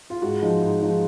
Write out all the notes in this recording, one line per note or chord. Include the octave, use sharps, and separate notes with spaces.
F4
G#2 F#4
F3 G#3 D#4
G#2
F3 G#3 D#4